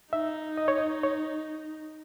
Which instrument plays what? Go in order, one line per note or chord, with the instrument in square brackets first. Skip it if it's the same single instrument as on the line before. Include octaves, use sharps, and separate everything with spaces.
[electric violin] D#4 [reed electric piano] E5
[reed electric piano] D#5
C#5
D#5
C#5